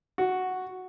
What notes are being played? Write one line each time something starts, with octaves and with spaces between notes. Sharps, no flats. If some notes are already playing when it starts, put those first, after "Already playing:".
F#4